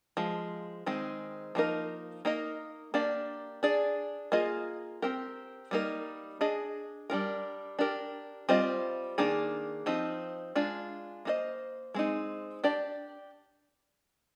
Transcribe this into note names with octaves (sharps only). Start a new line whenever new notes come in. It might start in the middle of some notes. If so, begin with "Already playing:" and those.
F3 G#3
D#3 G#3 C4
F3 A#3 D#4 A#4
A#3 D#4 A#4 D#5
A#3 D4 G4 D5
D4 G#4 D5
A#3 F4 G#4 D#5
C4 G4 A#4
G3 A#3 D#4 A#4
D4 G#4 D#5
G3 D4 F4 A#4
D4 G4 A#4
G3 C4 F4 C5 D#5
D#3 A#3 D4 G#4
F3 C4 D#4 G4
G#3 D4 F4
A#3 F4 C5 D#5
G#3 C4 D#4
D4 G4 D5